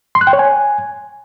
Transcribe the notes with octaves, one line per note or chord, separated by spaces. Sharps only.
C6
F#6
G5
C#5
G#5